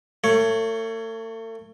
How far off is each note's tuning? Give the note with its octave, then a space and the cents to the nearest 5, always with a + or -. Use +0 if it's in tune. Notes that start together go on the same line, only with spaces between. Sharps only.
A3 +40 C#5 +0